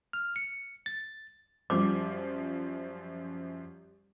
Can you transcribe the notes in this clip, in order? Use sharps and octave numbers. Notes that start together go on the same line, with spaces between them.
F6
C#7
A6
F#2 F3 G3 D6